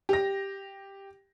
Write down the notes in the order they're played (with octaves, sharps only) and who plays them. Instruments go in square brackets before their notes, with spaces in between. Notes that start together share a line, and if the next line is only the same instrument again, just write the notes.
[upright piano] G4 A#6